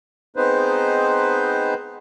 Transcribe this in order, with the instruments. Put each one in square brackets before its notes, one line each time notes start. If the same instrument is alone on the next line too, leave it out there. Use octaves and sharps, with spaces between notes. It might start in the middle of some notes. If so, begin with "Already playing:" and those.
[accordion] G#3 B3 C4 D#4 B4 C5